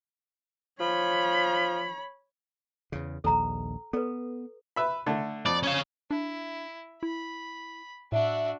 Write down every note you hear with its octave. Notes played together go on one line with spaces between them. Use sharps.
F3 C#5 B5
E2 C#3
A#1 D#2 A4 A#5
B3 A4 B4
B4 E5 B5
D3 A3
F2 D5
C#4 F5
D4 E4
E4 B5
A2 D4 F#4 E5